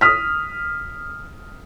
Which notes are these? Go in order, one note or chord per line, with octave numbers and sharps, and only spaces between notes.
D#6 F6 B6